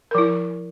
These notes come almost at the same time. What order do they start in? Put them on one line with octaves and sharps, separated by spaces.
A#4 F3 E4